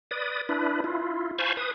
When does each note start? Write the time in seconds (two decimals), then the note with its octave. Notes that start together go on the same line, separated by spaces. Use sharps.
0.11 B4 D5 D#6
0.49 D4 E4 B4
0.84 E4 F4
1.38 C5 F5 G#5 A5 B5 C#6
1.57 B4 D#6